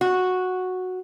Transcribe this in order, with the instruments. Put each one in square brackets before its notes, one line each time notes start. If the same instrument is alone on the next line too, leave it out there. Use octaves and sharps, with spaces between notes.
[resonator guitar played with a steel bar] F#4